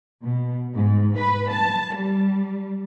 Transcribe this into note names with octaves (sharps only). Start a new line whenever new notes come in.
B2
G#2
B4
A5
G3